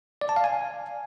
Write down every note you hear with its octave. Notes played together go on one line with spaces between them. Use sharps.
D5
A5
F5
G#5